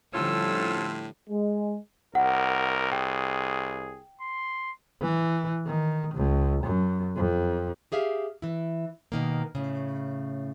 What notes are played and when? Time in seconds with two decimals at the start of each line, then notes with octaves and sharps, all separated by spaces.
0.14 A2 D3 F3 G3 A3 C#4 F4 E6
1.30 G#3
2.15 C2 A#4 F#5
2.92 G#4 G5
4.21 C6
5.01 E3
5.67 D#3
6.15 C#2
6.64 F#2
7.16 F2
7.92 G4 G#4 E5 F5
8.42 E3 E4
9.12 B2 D#3 A#3
9.55 A2 C#3